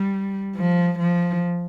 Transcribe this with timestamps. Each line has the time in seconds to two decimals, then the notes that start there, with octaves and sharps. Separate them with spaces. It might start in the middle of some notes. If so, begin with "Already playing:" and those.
Already playing: G3
0.56 F3
0.99 F3